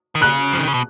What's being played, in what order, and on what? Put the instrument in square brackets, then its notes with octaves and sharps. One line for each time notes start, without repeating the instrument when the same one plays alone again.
[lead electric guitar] D#3
[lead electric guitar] C#3 [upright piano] F#6
[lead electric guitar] F3
D#3
C#3
B2